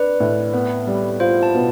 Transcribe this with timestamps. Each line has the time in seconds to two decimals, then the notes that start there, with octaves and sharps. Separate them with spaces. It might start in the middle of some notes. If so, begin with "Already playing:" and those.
Already playing: D4 B4
0.20 A2
0.54 B3
0.87 G3
1.20 F4 C5
1.43 A5
1.55 B2